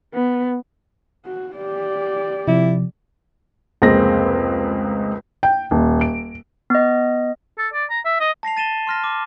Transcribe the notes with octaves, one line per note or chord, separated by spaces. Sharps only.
B3
F#4
G4 D5
C3 F3 E4
F1 C#2 A#3 C4 G#4 A#6
G5
D#1
D7
B3 D#5
A4
D5
A#5
E5
D#5
A5 A#6 C7 F7
A6 D#7 E7 G7
C6 F6 A#6
D6